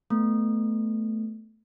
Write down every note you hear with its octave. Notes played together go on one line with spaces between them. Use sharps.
A3 B3